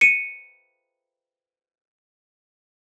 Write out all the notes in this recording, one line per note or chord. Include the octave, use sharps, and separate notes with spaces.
C#7 D#7